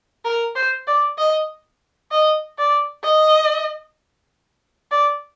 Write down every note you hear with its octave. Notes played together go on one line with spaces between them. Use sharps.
A#4
C5
D5
D#5
D#5
D5
D#5
D5